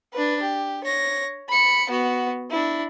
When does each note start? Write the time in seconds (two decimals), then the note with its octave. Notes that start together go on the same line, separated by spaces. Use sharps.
0.13 D4 B4
0.42 G4
0.84 C#5 A#6
1.49 B5 C#7
1.90 B3 F#4
2.50 D4 E4